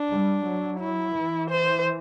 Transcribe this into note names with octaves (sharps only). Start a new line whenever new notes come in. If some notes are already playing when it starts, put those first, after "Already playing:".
Already playing: D4
G3
F#3
E4
E3
C5